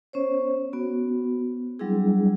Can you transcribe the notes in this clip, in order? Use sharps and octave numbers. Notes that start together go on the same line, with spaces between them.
B3 C#4 C5 C#5
B3 F#4
F#3 G3 C4 D4 E4 G#4